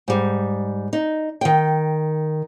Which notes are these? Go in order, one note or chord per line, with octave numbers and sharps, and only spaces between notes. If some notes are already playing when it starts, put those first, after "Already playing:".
G#2 G3
D#4
D#3 G5